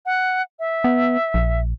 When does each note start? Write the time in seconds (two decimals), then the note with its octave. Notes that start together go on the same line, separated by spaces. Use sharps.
0.06 F#5
0.59 E5
0.84 B3
1.34 A#1